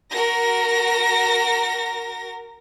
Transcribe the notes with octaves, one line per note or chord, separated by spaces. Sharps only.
F#4 A#4 A#6